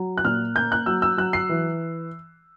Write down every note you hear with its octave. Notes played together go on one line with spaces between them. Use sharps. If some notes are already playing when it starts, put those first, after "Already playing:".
Already playing: F#3
F#6
A#2 F6
A#3 G6
F#6
F#3 E6
E6
F#3 F#6
C7
E3